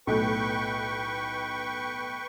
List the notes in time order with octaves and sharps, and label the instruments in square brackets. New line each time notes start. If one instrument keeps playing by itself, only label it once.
[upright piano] B1 A2 [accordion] B4 G5 C#6